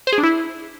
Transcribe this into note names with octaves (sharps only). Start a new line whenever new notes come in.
C5
G#4
D4
E4